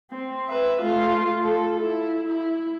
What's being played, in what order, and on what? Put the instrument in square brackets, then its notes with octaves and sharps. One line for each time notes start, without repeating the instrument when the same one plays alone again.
[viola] C4
B4 E5
A3 F4
A4
E4
E4